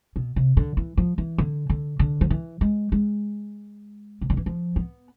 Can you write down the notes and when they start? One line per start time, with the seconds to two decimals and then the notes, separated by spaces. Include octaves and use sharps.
0.16 B2
0.36 C3
0.57 D3
0.77 E3
0.97 F3
1.18 E3
1.38 D3
1.70 D3
1.99 D3
2.21 F3
2.30 E3
2.61 G#3
2.92 G#3
4.21 C3
4.30 D3
4.37 E3
4.46 F3
4.76 B3